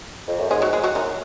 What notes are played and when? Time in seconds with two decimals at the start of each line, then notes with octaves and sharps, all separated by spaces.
0.28 F2
0.40 F#2
0.51 G#2 G#3 G#4
0.62 F#3 F#4
0.73 G#3 G#4
0.84 F#3 F#4
0.95 F#2 D#3 D#4